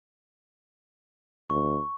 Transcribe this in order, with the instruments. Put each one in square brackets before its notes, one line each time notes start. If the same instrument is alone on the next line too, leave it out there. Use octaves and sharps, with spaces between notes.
[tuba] D2 [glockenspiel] C#6